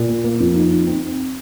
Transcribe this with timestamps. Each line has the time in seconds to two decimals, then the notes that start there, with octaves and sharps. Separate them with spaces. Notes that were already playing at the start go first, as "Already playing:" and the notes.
Already playing: A#2
0.08 A#3
0.24 A#3
0.40 F2
0.55 D#4
0.72 D#4
0.87 C4